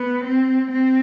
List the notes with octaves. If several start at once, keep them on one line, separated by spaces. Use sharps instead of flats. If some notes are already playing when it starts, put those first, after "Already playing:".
Already playing: B3
C4
C4